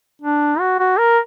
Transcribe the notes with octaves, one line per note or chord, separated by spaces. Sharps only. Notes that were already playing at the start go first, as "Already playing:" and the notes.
D4
F#4
F#4
A#4